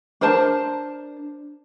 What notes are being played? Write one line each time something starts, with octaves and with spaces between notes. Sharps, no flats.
D4 A#4 C5 A5